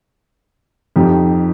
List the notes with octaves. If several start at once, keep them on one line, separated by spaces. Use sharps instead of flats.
F2 F3 D#4 G4